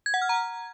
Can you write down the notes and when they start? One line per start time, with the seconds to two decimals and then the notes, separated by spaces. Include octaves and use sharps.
0.06 G#6
0.14 F#5
0.22 F6
0.29 A#5